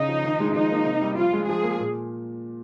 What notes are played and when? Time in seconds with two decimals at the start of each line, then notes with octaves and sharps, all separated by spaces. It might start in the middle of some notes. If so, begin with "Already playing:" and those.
Already playing: C#3 D#4
0.08 F3
0.24 D#3
0.40 G#3
0.54 F3 D#4
0.71 A#3
0.85 C3
1.02 G3
1.17 F3 F4
1.33 G#3
1.47 F3 G#4
1.63 A#3
1.80 A#2